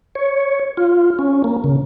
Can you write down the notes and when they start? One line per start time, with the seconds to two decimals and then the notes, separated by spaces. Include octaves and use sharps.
0.15 C#5
0.77 F4
1.19 C#4
1.44 A#3
1.64 C#3